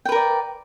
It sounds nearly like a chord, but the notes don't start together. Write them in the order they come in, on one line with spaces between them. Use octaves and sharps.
G5 B4 A#4 D5